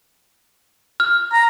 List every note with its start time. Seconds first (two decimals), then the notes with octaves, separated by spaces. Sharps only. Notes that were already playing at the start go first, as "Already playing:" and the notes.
1.00 F6
1.33 A#5